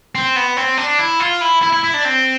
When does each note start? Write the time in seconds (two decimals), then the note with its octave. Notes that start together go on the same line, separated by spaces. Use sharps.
0.15 C4
0.36 B3
0.57 C4
0.78 D4
0.99 E4
1.20 F4
1.42 E4
1.62 E4
1.73 E4
1.83 E4
1.94 D4
2.05 C4